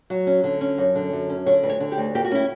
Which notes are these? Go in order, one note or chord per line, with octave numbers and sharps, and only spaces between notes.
F#3
C#4
D3
C#4
F#2
D3
F#2
C#4
D3 C#5
D2 B4
C#5
D3
G4
D2
A#3 G4
F#4
C#4 E4